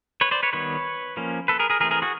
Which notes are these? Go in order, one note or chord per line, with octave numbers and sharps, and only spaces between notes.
B4 C#5
C5 D5
B4 C#5
D#3 G3 B3 B4 C#5
F3 A#3 C#4
A4 B4
G#4 A#4
G#4 A#4
E3 A3 C4 G#4 A#4
G#4 A#4
F#4 G#4